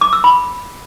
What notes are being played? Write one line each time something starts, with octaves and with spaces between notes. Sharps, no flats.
D6
E6
B5